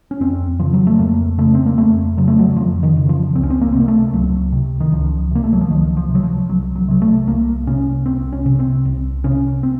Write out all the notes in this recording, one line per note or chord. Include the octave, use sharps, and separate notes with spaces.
C#4
F2 C4
C#3 F3
F#3
A3
F2 A#3
C#3 A3
C4
A#3
F2 A3
C#3 F#3
A3
F#3
F2 F3
D#3
C#3
F3
C#2 C4
C#4
C4
A#3
C4
C3
A#3
A3
C#2 F#3
C3
D#3
C#2 F3
C3 A#3
A3
F#3
F3
C#2 D#3
F3
C3
F#3
F3
C2 F#3
F#3
C3 F#3
A3
C2 A#3
C3 C#4
C2 C4
C#4
C3
C4
C2
C3 C#4
C4